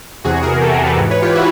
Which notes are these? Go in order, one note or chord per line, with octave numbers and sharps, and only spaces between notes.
E2 C3 E3 F#4 G#4
G#4 A#4
G4 A4
G#4 A#4
A4 B4
G#2 E3
B4 C#5
F4 G4
E4 F#4